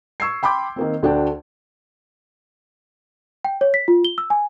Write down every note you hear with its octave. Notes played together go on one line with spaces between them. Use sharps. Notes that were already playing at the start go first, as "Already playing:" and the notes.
C#6 E6 G#6 C7
G5 B5 C6 D6 G6
D#3 A#3 C4
D2 A3 D4 F#4 D5 G5
G5
C#5
B6
F4
G7
E6
G#5